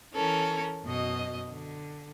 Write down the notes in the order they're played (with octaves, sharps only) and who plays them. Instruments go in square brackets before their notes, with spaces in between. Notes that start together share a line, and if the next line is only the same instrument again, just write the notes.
[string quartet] E3 C#4 A4 A#4
F#2 B2 D#5
D3